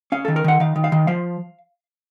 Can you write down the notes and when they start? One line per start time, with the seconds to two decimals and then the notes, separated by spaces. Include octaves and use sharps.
0.12 C#4 F5
0.25 D#3 A4
0.36 A#4
0.44 D#3 F#5
0.60 D#3 F5
0.76 D#3
0.84 F5
0.92 D#3
1.07 F3 F5